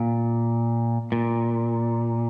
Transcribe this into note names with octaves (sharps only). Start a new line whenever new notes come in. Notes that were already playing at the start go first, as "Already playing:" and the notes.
Already playing: A#2
A#2